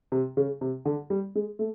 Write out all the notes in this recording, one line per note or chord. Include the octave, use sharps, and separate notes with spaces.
C3
C#3
C3
D3
G3
G#3
A3